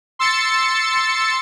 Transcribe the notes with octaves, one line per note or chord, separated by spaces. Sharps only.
C6 E6 A6 C#7